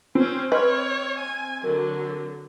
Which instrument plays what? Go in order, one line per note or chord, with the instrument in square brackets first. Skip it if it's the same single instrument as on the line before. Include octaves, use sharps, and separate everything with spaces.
[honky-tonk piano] C4 [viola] C#4 C5
[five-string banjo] B4 [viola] C#5 [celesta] D#5 C6 F6
[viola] G#5
[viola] D3 F#3 [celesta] A#4